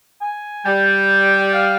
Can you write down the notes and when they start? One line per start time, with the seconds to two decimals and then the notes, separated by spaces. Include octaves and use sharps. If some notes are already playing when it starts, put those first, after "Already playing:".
0.21 G#5
0.65 G3 G5
1.54 F5